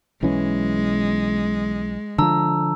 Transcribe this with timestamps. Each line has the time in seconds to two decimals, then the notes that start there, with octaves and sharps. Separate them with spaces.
0.23 B1 E3 G#3 C#4
2.18 D3 F3 A5 A#5 E6